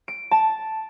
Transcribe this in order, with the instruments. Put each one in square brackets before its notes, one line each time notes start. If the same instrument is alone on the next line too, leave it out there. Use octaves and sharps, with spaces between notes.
[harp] D7
A5